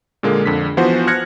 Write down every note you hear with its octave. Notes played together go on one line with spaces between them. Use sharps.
A#2 D3 G#3 A#3
F2 D3 B6
E3 F3 B3 F#4 C5
F6 F#6 G#6 A#6 C#7